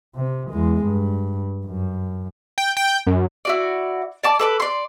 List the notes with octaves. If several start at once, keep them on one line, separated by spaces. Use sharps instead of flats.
C3
E2 G#3
G2
F#2
G5
G5
F#2
E4 F#4 D5
D5 A5 D6
A4 B4 D6
D5 C6